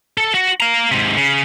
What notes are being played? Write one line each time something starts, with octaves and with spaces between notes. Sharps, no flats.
A4
F#4
F5 A#5
G#2 C3
C#3